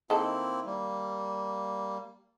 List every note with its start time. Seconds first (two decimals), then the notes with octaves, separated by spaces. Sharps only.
0.10 D#3 A#3 C4 E4 A4
0.65 G3 A#3